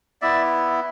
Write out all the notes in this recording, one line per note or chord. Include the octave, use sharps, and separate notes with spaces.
B3 E4 D5 E5